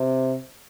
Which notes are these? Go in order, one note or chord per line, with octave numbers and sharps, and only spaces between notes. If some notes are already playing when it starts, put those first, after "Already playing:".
Already playing: C3